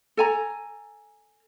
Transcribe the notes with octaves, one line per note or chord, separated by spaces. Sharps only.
A4 G#5 A#5